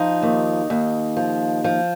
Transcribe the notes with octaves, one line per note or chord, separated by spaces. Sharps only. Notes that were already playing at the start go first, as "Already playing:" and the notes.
Already playing: F3 D#4
D#2
D#2
F3
F3